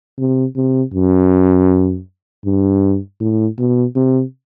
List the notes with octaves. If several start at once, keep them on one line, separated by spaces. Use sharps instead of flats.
C3
C3
F#2
G2
A2
B2
C3